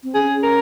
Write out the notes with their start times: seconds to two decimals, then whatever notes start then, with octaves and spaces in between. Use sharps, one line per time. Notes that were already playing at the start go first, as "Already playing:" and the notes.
0.03 C4
0.14 C#4 G#4
0.43 A#4